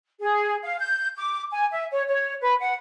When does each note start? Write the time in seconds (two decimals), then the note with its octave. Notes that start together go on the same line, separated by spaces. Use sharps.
0.20 G#4
0.63 F5
0.79 G6
1.16 D6
1.51 G#5
1.72 E5
1.91 C#5
2.08 C#5
2.41 B4
2.60 F#5